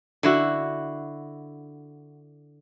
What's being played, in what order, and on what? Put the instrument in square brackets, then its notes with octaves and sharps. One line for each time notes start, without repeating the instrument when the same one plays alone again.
[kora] D3 E4 F#4